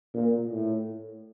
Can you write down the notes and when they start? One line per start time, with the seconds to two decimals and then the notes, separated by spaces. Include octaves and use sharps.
0.14 A#2
0.50 A2